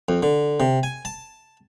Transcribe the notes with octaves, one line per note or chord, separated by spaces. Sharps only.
F2
D3
C3
G#5
A5